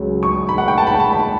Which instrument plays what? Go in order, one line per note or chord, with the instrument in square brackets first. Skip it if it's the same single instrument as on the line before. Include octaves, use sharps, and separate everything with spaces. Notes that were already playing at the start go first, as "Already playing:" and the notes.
Already playing: [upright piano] C#2 C#3 F#3
C#6
B5
F#5
G5
A5
B5
A5
B5